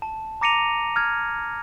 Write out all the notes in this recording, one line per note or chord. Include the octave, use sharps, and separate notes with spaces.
A5
A#5 D6 A#6 C#7 D#7 F7
F6 G#6